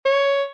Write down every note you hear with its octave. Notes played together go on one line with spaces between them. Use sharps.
C#5